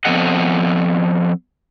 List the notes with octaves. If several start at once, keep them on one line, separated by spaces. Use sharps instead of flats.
F3 B3 C4 A4 D#5 F#5